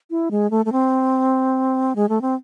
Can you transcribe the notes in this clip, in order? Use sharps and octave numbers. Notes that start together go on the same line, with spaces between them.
E4
G#3
A3
A3
C4
G#3
A3
C4